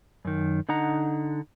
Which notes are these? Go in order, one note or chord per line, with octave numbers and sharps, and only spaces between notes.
F#2 D#3
D3 D#4 F#5 A#5